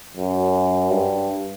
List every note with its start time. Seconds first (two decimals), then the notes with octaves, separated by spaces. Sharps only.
0.16 F#2
0.90 G2